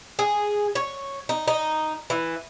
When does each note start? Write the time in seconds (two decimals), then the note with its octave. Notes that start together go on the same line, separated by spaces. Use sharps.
0.19 G#4
0.75 C#5
1.29 D#4
1.48 D#4
2.10 E3